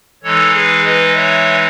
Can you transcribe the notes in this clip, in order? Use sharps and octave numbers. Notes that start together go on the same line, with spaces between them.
E3 G#3 D#4 A4 C#5
G#4 B4
B4 D#5
C#5 E5